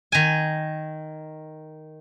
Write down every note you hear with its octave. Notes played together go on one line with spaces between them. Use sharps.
D#3 G#5